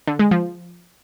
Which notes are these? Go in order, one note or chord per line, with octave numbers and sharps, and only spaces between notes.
D3
G#3
F3